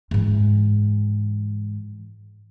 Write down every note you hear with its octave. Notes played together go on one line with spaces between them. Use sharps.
G#2 E3